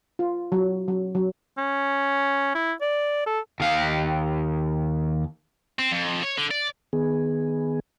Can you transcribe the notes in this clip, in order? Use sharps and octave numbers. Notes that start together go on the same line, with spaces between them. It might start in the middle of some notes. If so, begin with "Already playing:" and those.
F4
F#3
F#3
F#3
C#4
E4
D5
A4
D#2 F5
C4
F2
C#5
D3
D5
D#3 B3 G#4